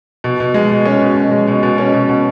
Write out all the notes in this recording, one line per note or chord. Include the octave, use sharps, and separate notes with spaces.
B2
B2
G#3
B2
C#4
B2
B2
G#3
B2
B2
C#4
B2
B2